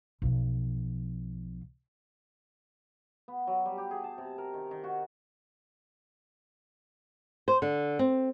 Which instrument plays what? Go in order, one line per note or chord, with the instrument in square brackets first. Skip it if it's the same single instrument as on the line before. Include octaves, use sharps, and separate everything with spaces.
[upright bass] B1 F3
[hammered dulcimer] B3
F#3
G3
G4
G#4
A5
C3
A#4
D#3
D#3
F#4
[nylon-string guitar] C5
D3
C4